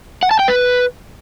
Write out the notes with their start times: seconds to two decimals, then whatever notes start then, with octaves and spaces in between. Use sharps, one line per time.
0.23 F#5
0.31 A5
0.40 G5
0.48 B4